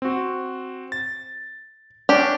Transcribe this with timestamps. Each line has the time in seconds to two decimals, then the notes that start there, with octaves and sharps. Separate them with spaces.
0.02 C4 F#4
0.92 A6
2.09 C#4 D4 G4